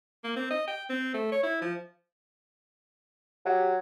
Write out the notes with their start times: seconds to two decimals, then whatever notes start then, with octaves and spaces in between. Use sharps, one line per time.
0.24 A#3
0.36 C4
0.51 D#5
0.67 G5
0.90 C4
1.14 A3
1.32 C#5
1.43 E4
1.62 F3
3.45 F#3 G4